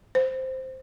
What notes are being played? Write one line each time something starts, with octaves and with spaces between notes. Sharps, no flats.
C5